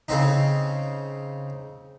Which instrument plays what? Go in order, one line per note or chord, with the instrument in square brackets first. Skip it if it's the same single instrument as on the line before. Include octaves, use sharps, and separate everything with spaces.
[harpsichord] C#3 C4 D#4